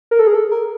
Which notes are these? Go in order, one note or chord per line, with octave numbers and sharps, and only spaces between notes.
A#4
A4
G#4
A4
A#4